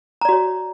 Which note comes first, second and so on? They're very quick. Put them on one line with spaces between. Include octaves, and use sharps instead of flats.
A#5 D5 F#4 C#5